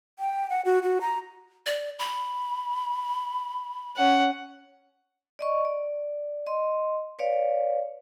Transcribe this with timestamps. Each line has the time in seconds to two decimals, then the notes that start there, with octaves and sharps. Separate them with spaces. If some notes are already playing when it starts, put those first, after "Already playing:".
0.19 G5
0.50 F#5
0.65 F#4
0.83 F#4
1.01 A#5
1.66 D5
1.99 B5
3.97 C#4 F#5
5.39 D5 D#5 C#6
5.65 D5
6.47 D#5 C6
7.19 B4 C#5 D5 F5